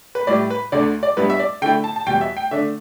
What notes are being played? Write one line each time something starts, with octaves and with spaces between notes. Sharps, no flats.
B4
A2 G3 E4 D5
B4
D2 D3 A3 D5
D5
G2 G3 B3 E4 B4
E5
D5
D3 A3 E4 G5
A5
A5
E2 B2 G3 G5
E5
G5
D3 A3 D4 E5